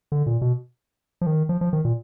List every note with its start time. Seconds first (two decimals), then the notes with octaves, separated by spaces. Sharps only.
0.12 D3
0.26 A#2
0.42 B2
1.21 F3
1.27 D#3
1.49 F3
1.61 F3
1.73 D#3
1.85 A#2